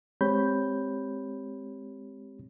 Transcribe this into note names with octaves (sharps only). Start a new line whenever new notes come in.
G#3 C4 G4 C#5 B5 G6